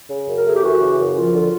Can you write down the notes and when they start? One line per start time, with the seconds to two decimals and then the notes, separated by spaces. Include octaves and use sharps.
0.10 C#3
0.27 F#2
0.37 A#4
0.45 A3 G#4
0.54 G4
0.63 E3 F#4
0.81 C#3
0.98 F#2
1.15 F3 F4
1.33 D3